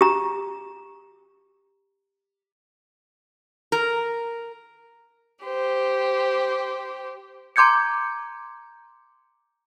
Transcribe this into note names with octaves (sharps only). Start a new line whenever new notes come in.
G4 A#5
A#4
G4 C5
A#5 C6 D6 G6 G#6 C#7